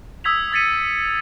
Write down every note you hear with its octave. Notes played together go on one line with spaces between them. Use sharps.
D#6 E6 G#6 B6 F7
D#6 G#6 A6 B6 C#7 D#7